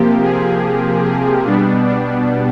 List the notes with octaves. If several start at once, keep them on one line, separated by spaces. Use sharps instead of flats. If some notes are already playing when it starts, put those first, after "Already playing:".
Already playing: C3 F3 A#3 G4
G#4
G#4
B2 G3 B3 D4
D4